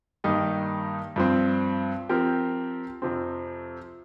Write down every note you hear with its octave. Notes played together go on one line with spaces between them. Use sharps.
G2 D#3 A#3 D#4 G4
G2 F3 C4
F3 C4 G4 A#4
F2 C3 F3 C4